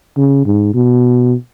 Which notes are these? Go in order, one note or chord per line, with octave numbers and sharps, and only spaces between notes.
C#3
G#2
B2